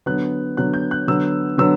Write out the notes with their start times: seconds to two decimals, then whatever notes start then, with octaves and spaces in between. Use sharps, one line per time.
0.06 D3 F#3 B3 F#6
0.57 D3 F#3 B3 F#6
0.74 G6
0.91 F#6
1.07 D3 F#3 B3 E6
1.58 D3 F#3 B3 E6